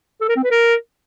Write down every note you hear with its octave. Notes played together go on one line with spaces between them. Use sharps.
A4
A#4
C4
B4
A#4